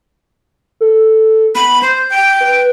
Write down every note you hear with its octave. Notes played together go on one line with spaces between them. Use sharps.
A4
B3 B5
C5 G6
G5
B4